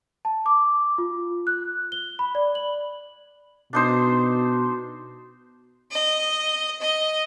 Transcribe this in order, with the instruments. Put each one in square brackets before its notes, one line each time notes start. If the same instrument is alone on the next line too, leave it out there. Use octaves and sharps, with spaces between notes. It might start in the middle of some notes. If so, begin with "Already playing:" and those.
[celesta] A5
D6
F4
F#6
G7
B5
D5
F#7
[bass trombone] B2 [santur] D4 D#4 C5
[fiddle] D#5
D#5